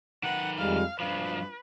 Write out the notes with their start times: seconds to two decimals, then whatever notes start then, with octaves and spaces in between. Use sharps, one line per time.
0.23 D#3 B4 F#5
0.59 F2 G3 G#3 F5
1.00 G2 F3 B4 F5